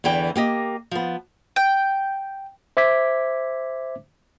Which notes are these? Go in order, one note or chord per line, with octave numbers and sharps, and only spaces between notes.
E2 D3 E3 G5
A#3 G4 D#5
F3 B3
G5
C5 E5 D6 G#6 B6